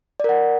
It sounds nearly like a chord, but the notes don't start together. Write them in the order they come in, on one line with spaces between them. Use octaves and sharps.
D5 A#4 F#5